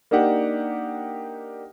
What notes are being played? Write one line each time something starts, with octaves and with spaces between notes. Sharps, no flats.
A#3 D4 D#4 G4 F#5